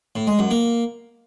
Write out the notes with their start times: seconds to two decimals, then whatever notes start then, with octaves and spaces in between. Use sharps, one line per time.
0.16 A2
0.27 G#3
0.39 F#2
0.51 A#3